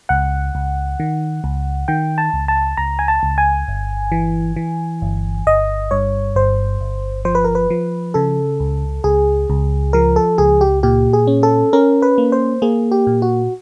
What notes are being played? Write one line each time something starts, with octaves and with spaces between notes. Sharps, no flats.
C#2 F#5
C#2
D#3
C#2
D#3 G5
A5
C#2
A5
C#2 A#5
G#5
A5
C#2
G#5
G1
E3
E3
G1
G1 D#5
G2 C#5
G1 C5
G1
F3 C5
B4
A#4
B4
F3
C#3 A4
C#2
C#2 G#4
C#2
F3 A#4
A4
C#2 G#4
G4
A#2 G4
G#4
C#4
A4
C#4 A#4
B4
A#3
C5
A#3 G#4
G4
A#2
F#4